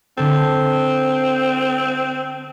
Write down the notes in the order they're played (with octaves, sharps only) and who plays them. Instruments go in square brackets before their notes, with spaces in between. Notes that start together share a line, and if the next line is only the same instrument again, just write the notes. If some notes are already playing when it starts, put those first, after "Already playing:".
[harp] D3 A4 [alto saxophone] C4